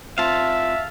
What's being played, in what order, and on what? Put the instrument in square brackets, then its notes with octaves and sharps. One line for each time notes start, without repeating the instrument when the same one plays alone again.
[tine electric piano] C4 F4 [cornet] E5 [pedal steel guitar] F5 A5